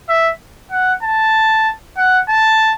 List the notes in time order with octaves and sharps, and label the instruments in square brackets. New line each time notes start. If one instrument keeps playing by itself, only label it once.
[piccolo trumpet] E5
F#5
A5
F#5
A5